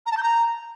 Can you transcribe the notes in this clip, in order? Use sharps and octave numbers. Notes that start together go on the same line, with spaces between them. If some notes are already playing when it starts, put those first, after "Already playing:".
A#5
A5
G6
A#5